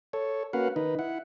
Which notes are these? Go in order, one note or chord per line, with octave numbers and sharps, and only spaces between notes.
A4 C#5
A#3 C#4 F#4 B4 F5 F#5
D#3 D#4 B4
E4 F#5